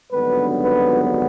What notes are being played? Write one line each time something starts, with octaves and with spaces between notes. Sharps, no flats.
G#1 G2 D3 F#3 B3 B4
B4